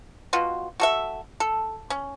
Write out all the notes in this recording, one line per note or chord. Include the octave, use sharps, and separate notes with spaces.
B2 F4 F#4
F#4 A4 E5
A4
C#4